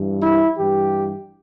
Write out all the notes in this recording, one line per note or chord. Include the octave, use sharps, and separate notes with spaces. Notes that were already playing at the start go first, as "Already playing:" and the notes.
Already playing: G2 E3
E4
G2 E3 G4